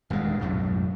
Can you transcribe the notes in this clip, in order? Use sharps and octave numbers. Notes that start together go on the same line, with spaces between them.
D#1 E2 G2 G#3
B1 F#2 A2